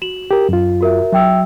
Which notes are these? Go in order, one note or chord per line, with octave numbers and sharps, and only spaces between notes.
F#4 E7 F#7
G4 A#4
F#2 F4
F#4 A#4 E5
F#3 E5 G5 E6